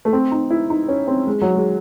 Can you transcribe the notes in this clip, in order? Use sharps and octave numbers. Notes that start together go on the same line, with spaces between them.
A3
C4
D#4
E4
D#4
C#4
C4
G#3
F#3
G#3